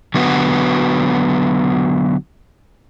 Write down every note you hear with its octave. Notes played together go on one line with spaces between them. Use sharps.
D3 F#3 B3 F#4